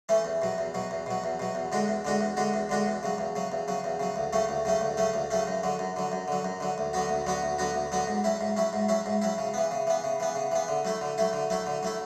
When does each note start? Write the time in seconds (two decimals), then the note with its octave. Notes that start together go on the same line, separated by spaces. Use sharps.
0.09 E3 A3 C#4
0.25 E2
0.42 B2 F#3
0.58 E2
0.74 B2 F#3
0.91 E2
1.06 B2 F#3
1.24 E2
1.40 B2 F#3
1.55 E2
1.72 D3 G#3 D4 F#4
1.88 E2
2.05 D3 G#3 D4 F#4
2.21 E2
2.37 D3 G#3 D4 F#4
2.54 E2
2.69 D3 G#3 D4 F#4
2.86 E2
3.03 C#3 F#3
3.18 E2
3.36 C#3 F#3
3.52 E2
3.68 C#3 F#3
3.84 E2
4.00 C#3 F#3
4.16 D2
4.33 C#3 F#3 A3 C#4
4.49 D2
4.65 C#3 F#3 A3 C#4
4.81 D2
4.97 C#3 F#3 A3 C#4
5.14 D2
5.31 C#3 F#3 A3 C#4
5.47 F#2
5.63 D3 F#3
5.79 F#2
5.96 D3 F#3
6.12 F#2
6.28 D3 F#3
6.45 F#2
6.60 D3 F#3
6.78 D2
6.93 D3 F#3 B3 F#4
7.09 D2
7.26 D3 F#3 B3 F#4
7.43 D2
7.58 D3 F#3 B3 F#4
7.74 D2
7.92 D3 F#3 B3 F#4
8.07 G#2
8.24 F#3 C#4 E4
8.41 G#2
8.57 F#3 C#4 E4
8.73 G#2
8.89 F#3 C#4 E4
9.06 G#2
9.22 F#3 C#4 E4
9.38 C#3
9.54 E3 B3
9.71 C#3
9.87 E3 B3
10.04 C#3
10.20 E3 B3
10.35 C#3
10.52 E3 B3
10.68 D3
10.85 F#3 A3 E4
11.01 D3
11.18 F#3 A3 E4
11.33 D3
11.50 F#3 A3 E4
11.67 D3
11.83 F#3 A3 E4